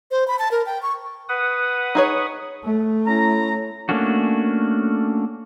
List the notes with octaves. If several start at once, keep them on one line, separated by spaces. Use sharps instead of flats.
C5
B5
A5
A#4
G5
C#6
B4 F#5 D#6
D#4 G#4 C#5
A3
C#4 E4 A#5
A3 A#3 C#4 D4 F#4